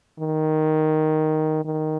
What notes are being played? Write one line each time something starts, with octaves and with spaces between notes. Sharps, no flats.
D#3
D#3